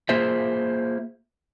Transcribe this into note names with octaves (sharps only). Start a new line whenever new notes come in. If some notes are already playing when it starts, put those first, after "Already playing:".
A#3 F4 G#4 C5 E5